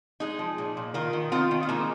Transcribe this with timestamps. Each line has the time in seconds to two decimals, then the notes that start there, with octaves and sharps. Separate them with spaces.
0.20 G#3 D#4 G#4
0.39 F3
0.58 A#2
0.77 A#2
0.94 D#3 F4 A#4
1.13 D#3
1.32 D#3 C4 F4
1.51 D#3
1.63 F4
1.69 G#3 A#3 D#4